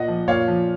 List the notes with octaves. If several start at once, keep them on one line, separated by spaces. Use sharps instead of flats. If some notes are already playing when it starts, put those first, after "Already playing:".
Already playing: A#2 D#5 F#5
F3
A#2 C#5 F5
F3